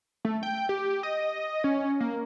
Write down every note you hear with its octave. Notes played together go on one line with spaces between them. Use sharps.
A3
G5
G4
D#5
C#4
A#3